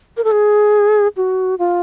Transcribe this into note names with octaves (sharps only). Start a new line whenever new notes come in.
A#4
A4
G#4
F#4
F4